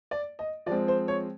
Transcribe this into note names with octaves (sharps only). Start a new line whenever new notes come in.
D5
D#5
F3 G#3 C4 D5
C5
C#5